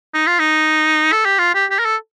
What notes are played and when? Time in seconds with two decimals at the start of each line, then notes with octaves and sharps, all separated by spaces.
0.14 D#4
0.27 F4
0.39 D#4
1.13 A4
1.26 G4
1.39 F4
1.55 G4
1.71 G4
1.79 A#4
1.85 A4